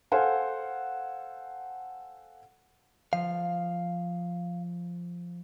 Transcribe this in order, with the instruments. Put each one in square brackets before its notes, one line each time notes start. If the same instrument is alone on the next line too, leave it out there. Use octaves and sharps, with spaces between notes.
[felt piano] A4 C5 F5 F#5 G#5
[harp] F3 [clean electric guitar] F5